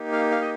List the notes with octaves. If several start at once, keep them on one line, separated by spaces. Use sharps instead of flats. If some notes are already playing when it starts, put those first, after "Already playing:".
Already playing: A#3 D#4 G4
F5
F5
D#5